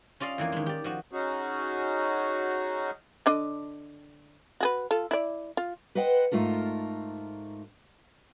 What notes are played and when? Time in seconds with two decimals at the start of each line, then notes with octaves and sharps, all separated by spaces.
0.20 C#4 F4 D5 D#5 F5
0.38 F2 E3 A#3
0.52 D#3 G#3
0.66 G4 D5
0.84 F3 F#4 D#5
1.11 C#4 D#4 F#4 G#4
3.26 D3 D4 D#5
4.61 F#4 G#4 B4
4.91 F4 A4
5.11 E4 D5
5.57 F4
5.95 B4 C5 D#5 F#5 G5
6.31 G#2 C#3 A3 F4 A#4 A5